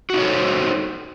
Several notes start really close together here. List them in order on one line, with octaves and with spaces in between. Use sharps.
F#4 D#4 C#5 A4 C5